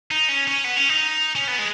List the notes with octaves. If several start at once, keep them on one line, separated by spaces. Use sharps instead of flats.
D#4
C#4
C#4
B3
C#4
D#4
C#4
B3
G#3